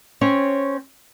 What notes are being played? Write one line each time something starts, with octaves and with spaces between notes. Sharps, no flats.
C4 C#4 C#5 G#5